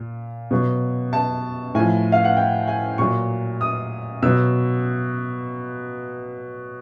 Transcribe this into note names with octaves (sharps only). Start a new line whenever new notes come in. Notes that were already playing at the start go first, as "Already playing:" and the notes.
Already playing: A#2
B2 F#3
A5
A2 F3 G#5
F5
F#5
G5
G#5
A#2 F#3 C#6
D#6
B2 F#3 E6